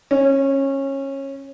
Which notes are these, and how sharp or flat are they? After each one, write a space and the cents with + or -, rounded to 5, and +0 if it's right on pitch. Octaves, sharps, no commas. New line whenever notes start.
C#4 -20